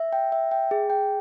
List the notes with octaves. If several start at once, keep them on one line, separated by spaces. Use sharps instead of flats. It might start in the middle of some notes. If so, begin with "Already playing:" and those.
Already playing: E5
G5
E5
G5
G#4
G5